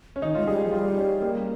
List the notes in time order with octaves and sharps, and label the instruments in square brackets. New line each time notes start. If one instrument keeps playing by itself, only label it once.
[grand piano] C#4
[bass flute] D#3 [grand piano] D#4
[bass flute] G#3 [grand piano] F4
[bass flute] G3 [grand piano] G#4
[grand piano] G4
[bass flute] F3
[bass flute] G3 [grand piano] F4
[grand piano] D#4
C#4
A#3